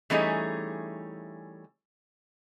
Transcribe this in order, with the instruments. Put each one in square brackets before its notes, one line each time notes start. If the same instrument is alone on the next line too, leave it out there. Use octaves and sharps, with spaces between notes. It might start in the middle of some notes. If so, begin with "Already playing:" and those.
[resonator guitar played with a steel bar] E3 G3 A3 C#4 D#4 G#4